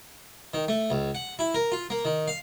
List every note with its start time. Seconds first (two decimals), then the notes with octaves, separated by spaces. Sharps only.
0.54 D#3
0.68 A3
0.90 C#2
1.15 F#5
1.39 E4
1.54 A#4
1.72 F4
1.90 A#3
2.05 D#3
2.28 F5